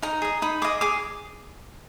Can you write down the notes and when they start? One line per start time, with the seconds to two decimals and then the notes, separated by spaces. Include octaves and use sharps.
0.02 D#4 A#5
0.22 G#4 D#5
0.42 D#4 B5
0.62 G#4 D#5 D6
0.81 G#4 D6